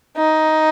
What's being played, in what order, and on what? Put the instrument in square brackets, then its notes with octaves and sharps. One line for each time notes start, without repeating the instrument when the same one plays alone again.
[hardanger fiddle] D#4